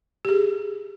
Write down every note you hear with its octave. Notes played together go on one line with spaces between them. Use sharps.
G4 G#4